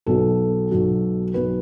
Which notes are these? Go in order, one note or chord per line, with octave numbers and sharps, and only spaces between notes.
B1 B2 F#3 A4
B1 B2 F#3
B1 B2 F#3 B4